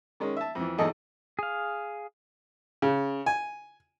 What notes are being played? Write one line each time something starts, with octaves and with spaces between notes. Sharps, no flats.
D#3 G#3 C#4
E5 A5
F2 E3
B1 E2 D#4 G#4 A4 D#5
G#4 F5
C#3
G#5